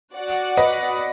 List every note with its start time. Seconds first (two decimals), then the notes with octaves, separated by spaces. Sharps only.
0.15 F#4 D5 F#5
0.57 B4 D#5